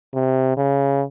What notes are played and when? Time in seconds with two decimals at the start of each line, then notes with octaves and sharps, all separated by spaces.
0.14 C3
0.57 C#3